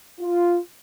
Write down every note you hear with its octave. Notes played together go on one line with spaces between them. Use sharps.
F4